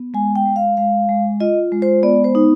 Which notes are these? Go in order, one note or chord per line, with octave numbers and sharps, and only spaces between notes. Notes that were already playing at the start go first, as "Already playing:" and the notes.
Already playing: B3
G#3 G#5
G5
G#3
F5
G#3 F5
G#3
F4 D#5
G#3
C5
B3 D5
C5
D#4